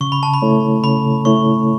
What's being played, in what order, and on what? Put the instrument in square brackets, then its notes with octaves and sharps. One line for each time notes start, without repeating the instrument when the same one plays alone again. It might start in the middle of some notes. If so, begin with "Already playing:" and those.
[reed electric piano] C#3 [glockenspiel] C#6
[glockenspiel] B5
A5
B5
[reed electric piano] A3 E4 A4 C#5
[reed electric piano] C#3 [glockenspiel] B5
[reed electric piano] A3 E4 A4 C#5 [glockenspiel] C#6